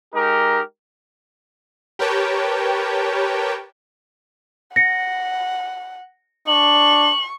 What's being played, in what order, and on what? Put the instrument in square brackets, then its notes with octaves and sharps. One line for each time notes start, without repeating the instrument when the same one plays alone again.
[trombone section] G#3 D#4 G4 A#4
[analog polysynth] G4 A#4 B4 C#5 G5 A5
[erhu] F#5 [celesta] A#6 C#7
[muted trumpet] D4 [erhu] C#6 [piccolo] F#7